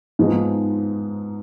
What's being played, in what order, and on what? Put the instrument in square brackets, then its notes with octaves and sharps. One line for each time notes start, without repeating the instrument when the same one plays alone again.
[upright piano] G#2 F3 G#3 B3 D#4